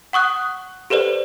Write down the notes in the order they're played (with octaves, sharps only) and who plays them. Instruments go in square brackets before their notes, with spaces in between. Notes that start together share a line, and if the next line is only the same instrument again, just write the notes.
[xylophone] F#5 C#6 D#6 F#6
G4 A4 B4 C5 D5